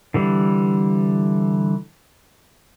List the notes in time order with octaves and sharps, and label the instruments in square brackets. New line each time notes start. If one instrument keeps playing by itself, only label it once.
[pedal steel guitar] D3 E3 G3